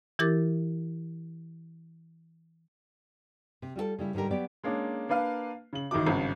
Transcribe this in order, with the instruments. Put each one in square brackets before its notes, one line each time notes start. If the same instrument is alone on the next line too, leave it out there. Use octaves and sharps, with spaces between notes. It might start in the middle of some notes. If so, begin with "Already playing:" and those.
[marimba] E3 E4 G4 A#4 D6 A6
[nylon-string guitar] C3
G3 F4 F#4 A4
C#3 G3 E4
G#2 D3 G3 G4 A#4
F#3 B3 G4 D5
[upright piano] G#3 A#3 C#4 D4
A#3 D4 B4 F5
C#3 F#7
A1 D#3 D#4 E4 F#4 D6
G#1 G2 C#3